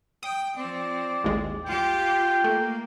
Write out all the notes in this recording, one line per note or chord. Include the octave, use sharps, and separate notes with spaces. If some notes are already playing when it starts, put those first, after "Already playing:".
G5 D#6
F3 C4 D5
A1 D#2 G#3
F4 G4 G5
A3 A#3